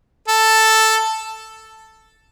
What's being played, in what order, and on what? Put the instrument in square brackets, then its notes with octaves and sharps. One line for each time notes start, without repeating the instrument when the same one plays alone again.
[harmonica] A4